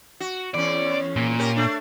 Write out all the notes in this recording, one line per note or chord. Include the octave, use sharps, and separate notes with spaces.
F#4
E2 C#4 D5
A#2
C#4 G4 A#4
A3 D4